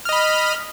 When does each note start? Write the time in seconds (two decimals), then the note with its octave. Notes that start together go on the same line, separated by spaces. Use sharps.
0.05 F6
0.09 D#5
0.12 B5